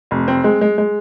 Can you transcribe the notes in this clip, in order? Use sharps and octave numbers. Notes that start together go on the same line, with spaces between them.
F1
C4
G#3
G#3
G#3